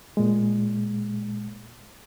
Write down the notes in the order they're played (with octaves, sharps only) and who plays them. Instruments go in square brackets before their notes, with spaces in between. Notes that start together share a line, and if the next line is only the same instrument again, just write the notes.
[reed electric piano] A#2 G#3